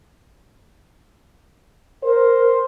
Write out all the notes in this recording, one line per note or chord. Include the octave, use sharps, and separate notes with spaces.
A#4 C5